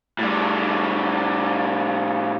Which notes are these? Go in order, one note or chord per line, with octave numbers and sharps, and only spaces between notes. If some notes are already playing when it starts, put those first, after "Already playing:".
A2 G3